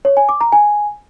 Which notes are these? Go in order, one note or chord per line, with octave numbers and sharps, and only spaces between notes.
C#5
G#5
D6
A#5
G#5